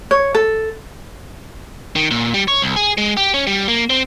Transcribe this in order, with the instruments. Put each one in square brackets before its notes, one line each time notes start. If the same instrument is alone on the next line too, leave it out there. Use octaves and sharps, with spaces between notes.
[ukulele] C#5
A4
[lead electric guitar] D#3
A#2
G3
C#5
C2
G#4
G#3
G4
C#4
G3
A#3
C4